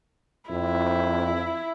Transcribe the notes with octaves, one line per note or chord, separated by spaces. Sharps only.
F2 E4